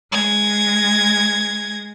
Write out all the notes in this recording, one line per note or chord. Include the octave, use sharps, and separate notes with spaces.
G#3 G#6 A#6